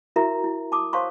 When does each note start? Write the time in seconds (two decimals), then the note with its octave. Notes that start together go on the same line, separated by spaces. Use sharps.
0.16 E4 F#4 A#4 E5 A#5
0.44 E4
0.72 A5 D6 D#6
0.93 C5 C#5 F5 A5 C6 C#6